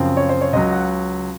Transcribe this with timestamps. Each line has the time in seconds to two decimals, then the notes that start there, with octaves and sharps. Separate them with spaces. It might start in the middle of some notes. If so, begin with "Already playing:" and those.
Already playing: F#2 C#3 F3 C4
0.17 C#5
0.29 C5
0.41 C#5
0.53 C#2 C#3 F#3 D#5
0.72 F#5